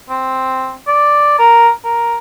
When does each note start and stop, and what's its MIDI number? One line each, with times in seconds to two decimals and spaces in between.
0.09 0.74 60
0.87 1.38 74
1.39 1.70 70
1.85 2.17 70